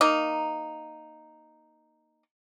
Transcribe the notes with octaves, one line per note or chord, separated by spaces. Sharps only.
A#3 D#4